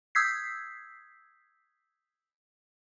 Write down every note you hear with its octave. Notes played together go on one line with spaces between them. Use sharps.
D#6 E6 G6 G#6 B6 C7